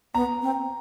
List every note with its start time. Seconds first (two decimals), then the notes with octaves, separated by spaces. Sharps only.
0.14 B3 A#5
0.42 C4